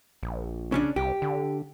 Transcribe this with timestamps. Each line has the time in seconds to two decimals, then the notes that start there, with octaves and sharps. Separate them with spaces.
0.23 A#1
0.72 C#3 C#4 D4
0.96 C2 G4
1.22 D3